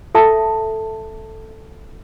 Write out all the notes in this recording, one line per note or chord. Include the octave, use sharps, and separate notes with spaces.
A4 E5 A5